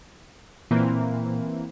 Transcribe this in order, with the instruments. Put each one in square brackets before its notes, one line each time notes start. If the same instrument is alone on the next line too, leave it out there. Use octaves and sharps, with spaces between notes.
[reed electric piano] A#2 [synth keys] E3 A#3 C4